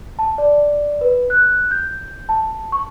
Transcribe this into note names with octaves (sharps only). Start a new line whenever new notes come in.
A5
D5
B4
F#6
G6
A5
C#6